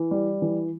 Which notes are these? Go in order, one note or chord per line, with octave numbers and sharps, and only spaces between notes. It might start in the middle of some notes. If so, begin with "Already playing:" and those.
Already playing: E3
G3
E3